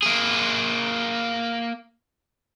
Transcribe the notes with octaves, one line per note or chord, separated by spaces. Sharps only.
A#3 G#4